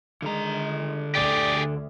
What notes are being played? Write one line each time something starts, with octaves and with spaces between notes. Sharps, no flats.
D3 D#3 G#3 A#5
D2 G4 G#4 D5